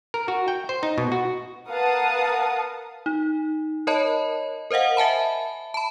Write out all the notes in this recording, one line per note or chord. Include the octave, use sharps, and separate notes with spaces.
A#4
F#4
G5
C5
D#4
B2
F#4
A#4 B4 F5 F#5 A5 D#6
D#4
A#4 C#5 D#5 A5 B5
A#4 C5 D#5 F5 F#5
E5 G#5 A5 B5
A5 B5